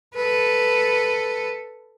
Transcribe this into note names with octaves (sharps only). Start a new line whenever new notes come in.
A4 B4